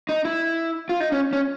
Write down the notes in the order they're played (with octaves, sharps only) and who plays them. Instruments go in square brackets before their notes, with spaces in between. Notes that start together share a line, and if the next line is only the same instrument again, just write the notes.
[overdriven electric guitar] D#4
E4
F4
D#4
C#4
C#4